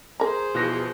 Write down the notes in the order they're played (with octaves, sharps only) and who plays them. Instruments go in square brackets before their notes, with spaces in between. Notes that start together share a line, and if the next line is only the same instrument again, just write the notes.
[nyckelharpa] G#4 C5 [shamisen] A#4 A#5
[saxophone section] E2 E3 F3 [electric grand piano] B2 F#6 A#6